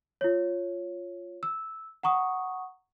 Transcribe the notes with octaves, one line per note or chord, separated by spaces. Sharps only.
F4 C#5
E6
F#5 A#5 C#6 D#6